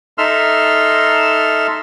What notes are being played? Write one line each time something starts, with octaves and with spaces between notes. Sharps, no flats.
D#4 A4 E5 C6 E6 F6